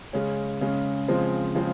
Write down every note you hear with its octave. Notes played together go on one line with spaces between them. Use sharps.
C#3 G#3 C#4
C#3 G#3 C#4
C#3 F3 G#3 C4
C#3 F3 G#3 C4